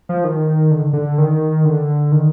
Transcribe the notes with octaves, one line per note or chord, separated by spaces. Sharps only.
F3
D#3
D3
D3
D#3
D3
D#3